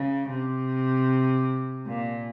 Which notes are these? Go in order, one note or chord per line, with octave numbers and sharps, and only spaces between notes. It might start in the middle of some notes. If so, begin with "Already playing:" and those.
Already playing: C#3
C3
A#2